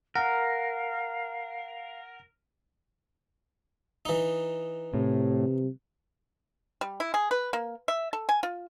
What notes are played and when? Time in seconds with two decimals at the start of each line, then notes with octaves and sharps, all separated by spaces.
0.15 A#4 F5 F#5
4.05 E3 D#4
4.94 A2 C3
6.81 G3
7.00 E4
7.14 G#4
7.31 B4
7.53 A#3
7.88 E5
8.13 A4
8.29 G#5
8.43 F4